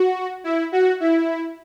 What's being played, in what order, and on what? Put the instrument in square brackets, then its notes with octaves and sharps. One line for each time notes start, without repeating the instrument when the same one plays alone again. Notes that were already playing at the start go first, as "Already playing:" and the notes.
Already playing: [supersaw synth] F#4
E4
F#4
E4